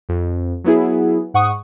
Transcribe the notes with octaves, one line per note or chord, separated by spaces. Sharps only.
F2
F#3 B3 E4 G#4
G#2 F#5 C#6 D#6